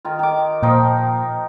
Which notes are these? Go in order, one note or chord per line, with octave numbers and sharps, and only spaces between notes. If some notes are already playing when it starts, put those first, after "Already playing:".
D#3 F4
D#3 D6
A#2 F3 D#4 G5